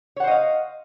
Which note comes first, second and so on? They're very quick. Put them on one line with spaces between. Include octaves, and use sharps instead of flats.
C#5 F#5 C5 D#5 F5